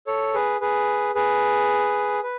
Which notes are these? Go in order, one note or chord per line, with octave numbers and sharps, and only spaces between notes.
A4 C#5
G#4 B4
G#4 B4
G#4 B4
B4